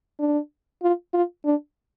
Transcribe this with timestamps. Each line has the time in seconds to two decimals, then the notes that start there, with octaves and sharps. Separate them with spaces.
0.20 D4
0.82 F4
1.13 F4
1.45 D4